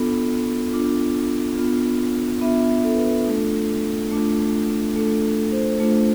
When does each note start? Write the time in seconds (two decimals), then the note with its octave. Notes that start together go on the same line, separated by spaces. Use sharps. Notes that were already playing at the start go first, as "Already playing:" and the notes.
Already playing: B3 D4 F4 A4
0.72 B3 D4 F4
1.57 B3 D4 F4
2.42 B3 D4 F4 E5
2.84 A4
2.94 B4
3.04 A4
3.26 A3 D4 F4 A4
4.12 A3 D4 F4
4.96 A3 D4 F4 A4
5.52 C5
5.80 A3 D4 F4